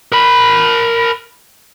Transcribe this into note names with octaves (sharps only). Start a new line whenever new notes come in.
A#4 B5